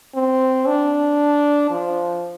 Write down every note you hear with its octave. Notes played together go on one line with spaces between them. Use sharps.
C4
D4
F3